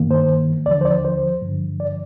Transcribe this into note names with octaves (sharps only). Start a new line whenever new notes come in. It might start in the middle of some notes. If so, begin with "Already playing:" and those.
Already playing: G2 D#3 A#3
C5
D#2 D3 F3 D5
C5
D5
C5
G2 D3 F3
D5